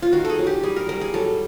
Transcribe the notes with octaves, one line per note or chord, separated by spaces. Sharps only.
F4
D#3 F#4
A4
G#4
F#3
G4
G3 G#4
A#4
G3 A#4
G#4
F#3 A4